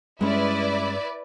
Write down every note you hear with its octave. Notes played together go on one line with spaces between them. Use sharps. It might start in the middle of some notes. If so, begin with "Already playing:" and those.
G2 G#3 C#4 E4 B4 D5